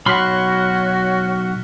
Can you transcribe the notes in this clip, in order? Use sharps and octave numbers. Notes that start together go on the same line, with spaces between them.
B1 F#4 C#5 B5 C6 F6 F#6 B6